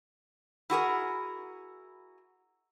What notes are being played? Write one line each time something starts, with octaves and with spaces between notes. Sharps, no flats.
E4 F#4 G#4 A#4